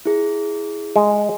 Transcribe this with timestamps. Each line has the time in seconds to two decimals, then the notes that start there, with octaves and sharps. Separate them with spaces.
0.05 E4 G#4
0.96 G#3